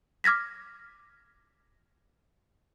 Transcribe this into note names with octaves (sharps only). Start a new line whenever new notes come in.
D6 F6 G#6 A#6 B6